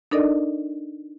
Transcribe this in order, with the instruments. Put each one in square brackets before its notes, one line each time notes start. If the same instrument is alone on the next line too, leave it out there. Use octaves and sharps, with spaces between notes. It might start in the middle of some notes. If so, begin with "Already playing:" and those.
[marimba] D4 D#4 A4 A#4 D5 D#5